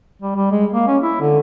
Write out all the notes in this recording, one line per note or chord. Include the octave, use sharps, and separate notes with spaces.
G3
G3
G#3
A#3
C#4
E4
D3